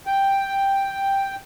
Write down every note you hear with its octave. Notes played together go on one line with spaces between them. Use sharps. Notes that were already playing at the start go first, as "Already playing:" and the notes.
G5